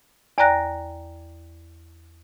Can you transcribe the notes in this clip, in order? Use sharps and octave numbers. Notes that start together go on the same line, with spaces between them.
E2 D5 G5 A#5 F#6 A#6